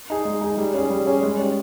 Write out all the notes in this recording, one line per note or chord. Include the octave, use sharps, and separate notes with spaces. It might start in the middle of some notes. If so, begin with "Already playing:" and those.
D#4 G#4
G#3
D#4 G#4
G3
C#4 G#4
G3
C#4 G#4
G#3
C#4 G4